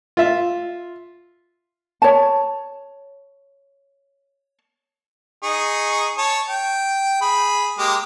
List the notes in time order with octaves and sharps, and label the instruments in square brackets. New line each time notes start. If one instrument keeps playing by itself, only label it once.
[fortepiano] F4 E5
[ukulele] C#5 A5
[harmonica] D#4 G#4 C#6
C#5 A5
G5
G#4 B5
G#3 A#3 G4